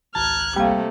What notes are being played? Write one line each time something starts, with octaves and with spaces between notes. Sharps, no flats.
G#1 C#2 A5 A#5 F6 F#6 G#6
C3 G3 A3 A#3 F5